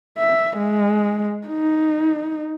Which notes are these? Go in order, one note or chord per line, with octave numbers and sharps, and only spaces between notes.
E5
G#3
D#4